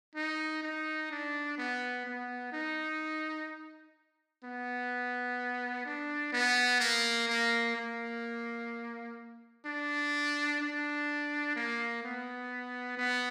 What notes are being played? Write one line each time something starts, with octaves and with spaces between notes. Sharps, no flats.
D#4
D#4
D4
B3
B3
D#4
B3
D4
B3
A#3
A#3
A#3
D4
D4
A#3
B3
B3